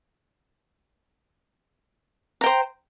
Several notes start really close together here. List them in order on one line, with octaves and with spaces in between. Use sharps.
A#5 G5 C5